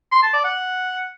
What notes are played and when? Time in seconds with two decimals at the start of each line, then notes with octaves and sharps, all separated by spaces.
0.12 C6
0.22 A5
0.33 D5
0.44 F#5